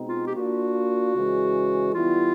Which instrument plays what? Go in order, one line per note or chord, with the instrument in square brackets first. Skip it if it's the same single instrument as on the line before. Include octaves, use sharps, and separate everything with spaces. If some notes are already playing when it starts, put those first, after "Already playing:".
Already playing: [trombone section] B2 G#3 C4 D#4
[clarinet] F4
G4
[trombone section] A#3 D4 F4 [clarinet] F#4
[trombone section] C#3 E3 G#3
[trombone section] E3 G3 B3 E4 [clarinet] F4